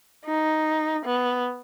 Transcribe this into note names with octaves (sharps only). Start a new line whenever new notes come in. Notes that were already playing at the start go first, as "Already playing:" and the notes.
D#4
B3